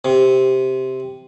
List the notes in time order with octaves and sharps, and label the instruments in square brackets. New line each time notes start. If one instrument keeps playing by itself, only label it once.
[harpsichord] C3